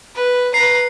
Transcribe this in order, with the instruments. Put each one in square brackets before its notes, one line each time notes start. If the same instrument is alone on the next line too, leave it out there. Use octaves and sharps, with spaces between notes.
[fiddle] B4
[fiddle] B4 A#5 [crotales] C7